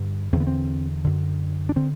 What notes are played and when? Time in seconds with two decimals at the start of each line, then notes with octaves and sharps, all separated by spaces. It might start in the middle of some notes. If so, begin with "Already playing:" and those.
Already playing: G2 D3
0.33 E2 C4
0.36 D3 B3
0.47 C4
1.04 F#2 D3
1.69 D4
1.76 D3 C4